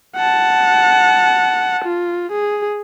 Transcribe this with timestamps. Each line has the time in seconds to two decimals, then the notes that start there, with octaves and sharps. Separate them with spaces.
0.16 F#5 A5
1.85 F4
2.32 G#4